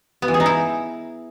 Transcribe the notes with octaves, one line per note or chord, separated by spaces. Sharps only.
B3
E3
G#4
D#4
E4